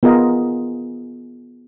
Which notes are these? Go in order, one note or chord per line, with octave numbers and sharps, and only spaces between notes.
B3 F4 G#4 A#4 D#5